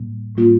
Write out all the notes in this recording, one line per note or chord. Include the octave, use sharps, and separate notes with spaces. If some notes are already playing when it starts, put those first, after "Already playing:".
Already playing: A2 G3 A#3
A2 G3 A#3 F4